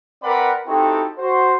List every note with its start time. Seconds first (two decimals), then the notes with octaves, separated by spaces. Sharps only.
0.23 C4 A#4 B4 D5 F#5 B5
0.68 C4 D#4 E4 F#4 G4 A4
1.19 F#4 C5